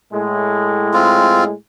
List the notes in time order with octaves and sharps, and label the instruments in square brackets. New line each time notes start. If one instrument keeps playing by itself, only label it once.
[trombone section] A2 G#3
[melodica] C4 F4